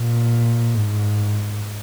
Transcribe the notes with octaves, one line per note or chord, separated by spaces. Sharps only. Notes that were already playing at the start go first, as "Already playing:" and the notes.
Already playing: A#2
G#2